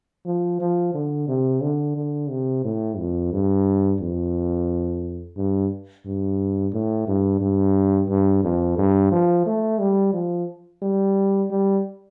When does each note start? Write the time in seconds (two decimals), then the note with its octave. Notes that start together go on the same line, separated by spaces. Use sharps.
0.26 F3
0.61 F3
0.94 D3
1.28 C3
1.62 D3
1.96 D3
2.30 C3
2.65 A2
2.98 F2
3.33 G2
4.01 F2
5.37 G2
6.06 G2
6.74 A2
7.08 G2
7.41 G2
8.09 G2
8.44 F2
8.78 G2
9.12 F3
9.47 A3
9.79 G3
10.13 F3
10.83 G3
11.51 G3